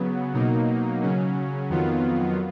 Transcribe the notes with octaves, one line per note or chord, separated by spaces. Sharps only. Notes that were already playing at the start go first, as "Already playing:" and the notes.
Already playing: C#3 F#3 B3
B2 F#3 A#3 D#4
C#3 F#3 C#4
F2 D#3 F#3 B3 F4